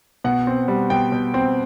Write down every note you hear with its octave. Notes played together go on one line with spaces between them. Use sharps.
B2 F#5
C4
G3
B2 G5
B2
C4